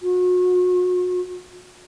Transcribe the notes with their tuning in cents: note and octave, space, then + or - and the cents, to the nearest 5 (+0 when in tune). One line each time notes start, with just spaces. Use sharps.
F#4 -35